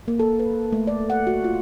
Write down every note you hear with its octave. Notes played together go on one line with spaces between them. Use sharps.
A#3
A4
B4
A3
D5
F#5
F#4
F4